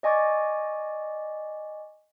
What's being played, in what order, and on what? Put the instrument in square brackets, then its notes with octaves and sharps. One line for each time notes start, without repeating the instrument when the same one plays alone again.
[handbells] D5 D#5 G#5 C#6 D6 A6